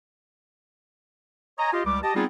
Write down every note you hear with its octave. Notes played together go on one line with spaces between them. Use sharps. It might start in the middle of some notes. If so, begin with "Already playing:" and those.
C#5 D#5 G#5 A#5
F4 G4 D#5
C#2 G3 D6
G4 D#5 A5
G3 B3 C4 D#4 F4 G#4